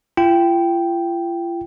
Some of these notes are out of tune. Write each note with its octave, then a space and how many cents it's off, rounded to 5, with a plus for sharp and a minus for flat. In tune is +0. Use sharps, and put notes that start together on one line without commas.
F4 -40 G5 -5